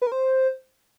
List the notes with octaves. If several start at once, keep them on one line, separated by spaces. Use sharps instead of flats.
B4
A#4
C5